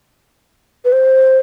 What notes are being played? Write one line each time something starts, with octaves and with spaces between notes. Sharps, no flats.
B4
C5